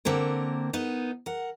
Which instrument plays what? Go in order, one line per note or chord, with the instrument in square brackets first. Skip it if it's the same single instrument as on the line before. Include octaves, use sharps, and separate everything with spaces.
[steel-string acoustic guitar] D3 A#3 C4 A#4
B3 D#4 A#4
A#4 F#5